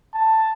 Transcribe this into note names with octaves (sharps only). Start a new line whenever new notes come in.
A5